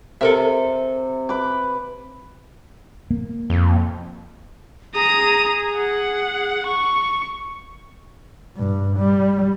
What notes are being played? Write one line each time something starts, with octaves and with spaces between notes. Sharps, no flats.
C3 A4 A#4 E5
B4 D6
A#3
F2
G#4 A#5 D#6
F#5
C#6
G2
G3